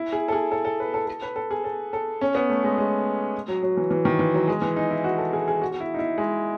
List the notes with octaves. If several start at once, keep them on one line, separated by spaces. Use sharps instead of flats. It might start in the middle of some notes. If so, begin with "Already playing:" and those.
Already playing: E4
G#4
A4
G#4
A4
A4
B4
A4
A4
B4
A4
G#4
A4
A4
C#4
B3
A3
G#3
G#3
F#3
F#3
E3
E3
D#3
E3
F#3
G#3
E3
D#4
E4
F#4
A4
G#4
G#4
F#4
F#4
E4
D#4
E4
G#3